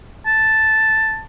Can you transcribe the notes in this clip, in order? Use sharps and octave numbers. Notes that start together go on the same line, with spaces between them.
A5